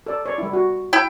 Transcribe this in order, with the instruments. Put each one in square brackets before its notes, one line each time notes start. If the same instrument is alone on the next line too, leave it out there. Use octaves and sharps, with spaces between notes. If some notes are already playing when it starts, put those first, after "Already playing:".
[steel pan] A4 D5
C#5 D5
G3 E4
F#4
[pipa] E4 G5